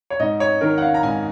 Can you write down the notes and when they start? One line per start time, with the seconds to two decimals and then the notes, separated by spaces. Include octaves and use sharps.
0.10 C#5
0.19 G#2 D#5
0.40 C#5
0.61 D#3 A#4
0.78 F#5
0.82 F5
0.94 A#5
1.03 G#2 G#5